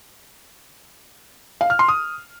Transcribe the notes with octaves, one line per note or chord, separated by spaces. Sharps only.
F5
F6
C6
D#6